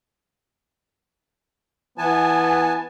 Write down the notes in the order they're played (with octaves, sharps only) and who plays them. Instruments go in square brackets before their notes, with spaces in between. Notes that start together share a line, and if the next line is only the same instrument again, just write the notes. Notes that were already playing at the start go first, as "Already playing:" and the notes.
[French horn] E3 [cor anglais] B3 [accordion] G#5 A5